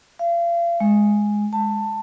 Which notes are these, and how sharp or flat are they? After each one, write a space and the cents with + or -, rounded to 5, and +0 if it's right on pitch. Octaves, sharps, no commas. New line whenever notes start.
F5 -35
G#3 +0
A5 +15